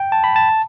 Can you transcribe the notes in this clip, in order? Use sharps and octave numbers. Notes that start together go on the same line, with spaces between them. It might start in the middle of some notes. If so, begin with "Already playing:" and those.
Already playing: G5
A5
B5
A5